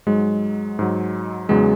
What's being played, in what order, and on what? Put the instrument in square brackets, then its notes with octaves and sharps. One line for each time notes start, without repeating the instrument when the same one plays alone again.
[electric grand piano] G#2 F#3 G#3
G#2 F#3
E2 C#3 F#3 G#3